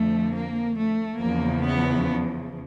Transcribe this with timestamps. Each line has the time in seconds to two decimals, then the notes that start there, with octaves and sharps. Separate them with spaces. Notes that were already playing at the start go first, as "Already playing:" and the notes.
Already playing: F2 D3 F3 A3
0.32 A#3
0.76 A3
1.19 E2 C#3 F3 A#3
1.62 B3